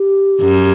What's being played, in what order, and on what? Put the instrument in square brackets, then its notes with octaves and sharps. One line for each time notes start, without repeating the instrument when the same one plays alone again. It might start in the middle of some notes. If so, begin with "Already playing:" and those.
Already playing: [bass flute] G4
[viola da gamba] F#2